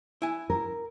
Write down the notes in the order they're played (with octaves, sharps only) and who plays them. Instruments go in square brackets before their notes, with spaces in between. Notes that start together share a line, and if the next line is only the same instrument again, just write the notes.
[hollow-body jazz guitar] E4 G#5
[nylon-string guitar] A#4